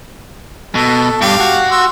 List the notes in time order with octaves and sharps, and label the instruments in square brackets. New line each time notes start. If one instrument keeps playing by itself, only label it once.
[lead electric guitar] B2 [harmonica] A4
[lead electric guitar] G2 [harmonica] G4 F5
[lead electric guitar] F#4
[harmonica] C6 E6